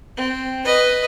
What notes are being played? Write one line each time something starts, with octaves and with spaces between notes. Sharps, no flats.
C4
B4 D#5